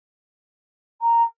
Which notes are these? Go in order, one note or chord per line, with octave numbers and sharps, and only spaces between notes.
A#5